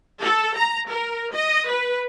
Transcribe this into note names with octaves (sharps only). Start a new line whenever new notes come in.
A4
A#5
A#4
D#5
B4